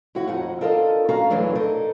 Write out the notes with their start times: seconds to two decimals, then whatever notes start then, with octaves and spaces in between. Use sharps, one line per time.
0.15 D#2 E4 F#4
0.27 F2 D#4 F#5
0.61 D4 F4 A4 A#4 D#5
1.09 C#4 F#4 F5 A#5
1.30 E2 E3 F#3 A3 D4
1.55 D#4 A4 A#4